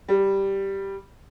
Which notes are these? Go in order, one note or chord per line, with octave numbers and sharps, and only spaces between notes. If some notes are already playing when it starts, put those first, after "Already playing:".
G3